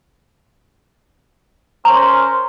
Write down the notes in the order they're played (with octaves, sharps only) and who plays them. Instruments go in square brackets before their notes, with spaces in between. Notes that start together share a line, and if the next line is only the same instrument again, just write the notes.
[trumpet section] C#4 A#4 C5 [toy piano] A#5